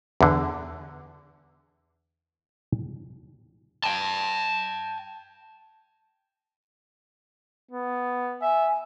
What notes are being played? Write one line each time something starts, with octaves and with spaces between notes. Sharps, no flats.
E2 D3
G5 A5
B3
E5 G#5